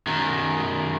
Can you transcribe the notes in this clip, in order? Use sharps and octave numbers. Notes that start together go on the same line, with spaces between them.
F#2 D#3